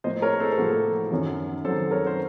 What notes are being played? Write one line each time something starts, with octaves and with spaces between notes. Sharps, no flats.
A2 F3 A#3 C5 D#5
A#4 C#5
A4 C5
A4
A2 F3 A#3 F#4 A#4
F#2 D#3 F#3
F#2 D#3 F#3 A4 C5
A#4 C#5
C5